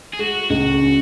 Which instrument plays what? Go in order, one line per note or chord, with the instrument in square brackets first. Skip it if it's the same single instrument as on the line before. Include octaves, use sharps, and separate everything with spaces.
[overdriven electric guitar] G#4
[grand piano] G#3 [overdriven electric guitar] F#4
[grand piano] C#2 [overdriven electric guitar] F#4
[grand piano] C#4